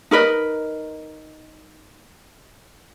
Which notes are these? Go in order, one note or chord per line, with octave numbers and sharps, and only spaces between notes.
D#4 A#4 B4 D#5